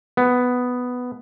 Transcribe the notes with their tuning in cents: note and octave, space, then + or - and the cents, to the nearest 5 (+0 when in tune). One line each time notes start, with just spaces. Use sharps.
B3 +5